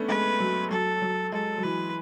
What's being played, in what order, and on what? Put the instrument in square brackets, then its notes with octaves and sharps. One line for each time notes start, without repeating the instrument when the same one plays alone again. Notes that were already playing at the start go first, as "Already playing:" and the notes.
Already playing: [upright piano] A3 B3 C#4 D4
[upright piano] G#3 [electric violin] B4
[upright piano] F#3
[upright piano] F#3 [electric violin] A4
[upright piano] F#3
[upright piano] G#3 [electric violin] A4
[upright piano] F#3
[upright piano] E3 [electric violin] B4